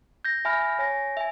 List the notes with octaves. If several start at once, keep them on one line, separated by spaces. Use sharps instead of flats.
G6 A#6
E5 G#5 B5 F6 A#6
C#5 G#5 A#6
E5 G#5